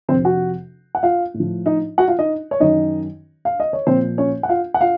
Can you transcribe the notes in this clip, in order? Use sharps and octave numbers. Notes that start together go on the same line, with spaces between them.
F2 C3 F3 C4 C5
F#4 F#5
F#5
F4 F5
A2
F3
D#4 D#5
F#4 F#5
F4 F5
D#4 D#5
C#5
F#2 D#3 D#4 D#5
F5
D#5
C#5
A#2 F3 C4 C5
C#4 C#5
F#5
F4 F5
F#5
F4 F5